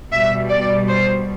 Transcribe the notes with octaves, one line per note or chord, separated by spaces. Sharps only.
B2 G3 E5
D5
C5